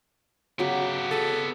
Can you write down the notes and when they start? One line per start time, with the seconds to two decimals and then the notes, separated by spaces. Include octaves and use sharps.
0.59 C#3 F#3 B3 F#4 G4
1.11 G#4 A4 B4 A5